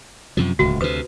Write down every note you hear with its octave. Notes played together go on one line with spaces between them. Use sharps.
F#2 C3 F3
D1 C#2 F#4
D2 C3 B4 C5 D#6